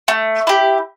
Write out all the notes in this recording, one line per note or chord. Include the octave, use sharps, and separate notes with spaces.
A3
E4 G4